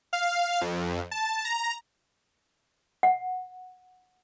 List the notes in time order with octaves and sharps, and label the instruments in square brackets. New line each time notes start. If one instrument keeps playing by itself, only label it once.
[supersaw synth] F5
F2
A5
A#5
[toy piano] F#5